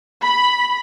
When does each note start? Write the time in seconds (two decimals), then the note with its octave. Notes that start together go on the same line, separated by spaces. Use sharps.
0.23 B5